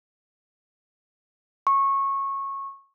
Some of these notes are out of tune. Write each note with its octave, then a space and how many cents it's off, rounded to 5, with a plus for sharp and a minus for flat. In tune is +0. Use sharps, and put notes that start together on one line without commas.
C#6 -20